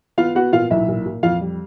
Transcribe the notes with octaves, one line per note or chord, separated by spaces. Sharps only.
B3 F4 F5
B3 F#4 F#5
A#2 F4 F5
B1 E4 E5
A#2
A#2
F2 F4 F5
G3